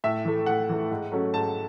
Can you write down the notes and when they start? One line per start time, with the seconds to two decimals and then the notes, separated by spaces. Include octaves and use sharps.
0.04 A2 E5
0.25 E3 A3
0.46 A2 F#5
0.69 E3 A3
0.91 G#2
1.12 F#3 A3 C#4
1.34 G#2 A5